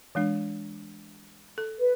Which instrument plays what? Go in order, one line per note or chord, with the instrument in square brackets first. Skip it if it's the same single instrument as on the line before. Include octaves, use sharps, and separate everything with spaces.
[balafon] E3 G#3 D4
A4
[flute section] B4